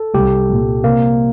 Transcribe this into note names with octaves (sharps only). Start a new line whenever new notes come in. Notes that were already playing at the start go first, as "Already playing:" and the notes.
Already playing: A4
C2 G4
A#2 G3
C3 A#3